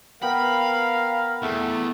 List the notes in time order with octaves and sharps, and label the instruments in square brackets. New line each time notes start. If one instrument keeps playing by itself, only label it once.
[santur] B3 G5 [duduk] A#4 [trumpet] F5 [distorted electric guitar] B5
[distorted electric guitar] E2 [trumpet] A3